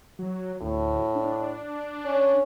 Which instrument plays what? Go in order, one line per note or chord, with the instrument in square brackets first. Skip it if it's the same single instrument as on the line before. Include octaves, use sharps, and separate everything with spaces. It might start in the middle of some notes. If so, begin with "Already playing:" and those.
[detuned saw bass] F#3
[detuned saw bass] D2 [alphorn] A2
[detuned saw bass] D4
[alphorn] C#4